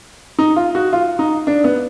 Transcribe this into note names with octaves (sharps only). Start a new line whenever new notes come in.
D#4
F4
F#4
F4
D#4
D4
B3